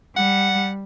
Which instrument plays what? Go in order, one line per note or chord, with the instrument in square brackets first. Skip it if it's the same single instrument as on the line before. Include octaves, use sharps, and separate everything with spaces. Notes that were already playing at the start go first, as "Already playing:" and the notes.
[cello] G3 [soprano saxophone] F#5